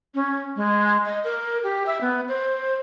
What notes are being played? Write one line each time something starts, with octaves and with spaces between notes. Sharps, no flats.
C#4
G#3
D#5
A#4
G4
E5
B3
C5